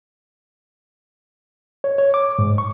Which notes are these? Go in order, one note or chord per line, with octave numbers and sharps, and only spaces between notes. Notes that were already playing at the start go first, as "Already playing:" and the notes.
C#5
C#5
D6
G#2
C#6